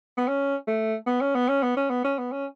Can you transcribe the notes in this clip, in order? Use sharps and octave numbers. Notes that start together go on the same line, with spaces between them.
B3
C#4
A3
B3
C#4
B3
C#4
B3
C#4
B3
C#4
B3
C#4